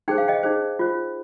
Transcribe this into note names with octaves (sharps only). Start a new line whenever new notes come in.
D#4 G#4 C5 G5
F5
D#5 G5
D#4 G#4 C5
F4 C5